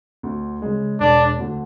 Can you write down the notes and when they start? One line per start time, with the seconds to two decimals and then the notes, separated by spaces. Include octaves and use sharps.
0.23 D2
0.62 C#3 G#3
1.00 E1 D4
1.39 D2 D3